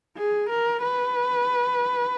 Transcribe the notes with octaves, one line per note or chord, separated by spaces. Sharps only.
G#4
A#4
B4